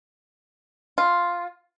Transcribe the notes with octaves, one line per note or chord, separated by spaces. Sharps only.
F4